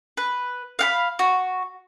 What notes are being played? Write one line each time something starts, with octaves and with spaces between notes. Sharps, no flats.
B4
F5 F#5 B5
F#4